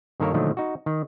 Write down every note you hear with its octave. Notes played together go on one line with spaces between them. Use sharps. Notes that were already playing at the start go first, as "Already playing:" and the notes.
G2 D#3 A#3 A4 A#4 C#5
A#2 D3 D#3 F3 F#3 A3
D#4 F#4
D#3